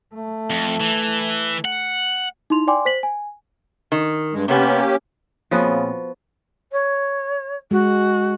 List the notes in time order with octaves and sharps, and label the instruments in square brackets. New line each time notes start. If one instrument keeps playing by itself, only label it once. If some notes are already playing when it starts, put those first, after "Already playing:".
[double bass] A3
[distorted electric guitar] F2
E3
F#5
[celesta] D#4 E4 C6 F7
D5 G5 G#5 C6 D6
C5 B6 F#7
G#5
[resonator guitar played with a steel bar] D#3
[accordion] G2 G#3
[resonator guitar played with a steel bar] C3 B3 [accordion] A#3 C#4 G4
[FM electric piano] A#2 C4 [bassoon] C#3 [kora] F3 B3 F#4
[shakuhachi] C#5
[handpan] G#3 [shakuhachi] F#4